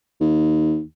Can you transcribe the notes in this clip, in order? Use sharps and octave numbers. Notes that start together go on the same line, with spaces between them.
D#2